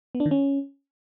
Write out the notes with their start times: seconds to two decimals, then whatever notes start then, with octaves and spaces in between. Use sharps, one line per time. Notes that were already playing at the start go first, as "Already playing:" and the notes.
0.15 B3
0.20 D4
0.26 D#3
0.31 C#4